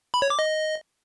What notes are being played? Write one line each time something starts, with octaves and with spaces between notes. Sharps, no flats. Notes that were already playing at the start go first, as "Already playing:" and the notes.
B5
C#5
D6
D#5